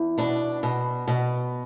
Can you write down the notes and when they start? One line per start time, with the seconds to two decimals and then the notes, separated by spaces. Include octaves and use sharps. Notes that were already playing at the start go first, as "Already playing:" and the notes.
Already playing: E2
0.18 B2 D4
0.63 B2
1.08 B2